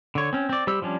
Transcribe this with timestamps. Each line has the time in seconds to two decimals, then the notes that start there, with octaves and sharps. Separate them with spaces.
0.15 D3 C#5
0.33 C4 C#4
0.49 C4 D5
0.67 G3 G4 C5 E6
0.82 F3 G3 C#4 D4